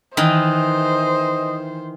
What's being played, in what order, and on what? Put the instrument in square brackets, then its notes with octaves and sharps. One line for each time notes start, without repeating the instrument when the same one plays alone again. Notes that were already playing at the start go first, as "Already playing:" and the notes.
[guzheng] D#3 E3 [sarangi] C5 [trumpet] D#5